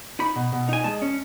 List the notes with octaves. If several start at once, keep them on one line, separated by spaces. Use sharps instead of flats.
D#4 B5
B2
B2
D#4 G#5
G#3 A5
C#4